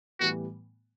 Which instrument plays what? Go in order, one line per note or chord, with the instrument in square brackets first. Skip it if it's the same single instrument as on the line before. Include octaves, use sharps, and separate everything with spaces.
[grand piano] A2 E3 G3 B3 [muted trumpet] F#4